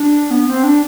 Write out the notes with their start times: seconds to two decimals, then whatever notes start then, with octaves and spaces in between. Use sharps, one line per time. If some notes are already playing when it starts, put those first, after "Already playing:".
Already playing: D4
0.31 B3
0.48 C4
0.64 D4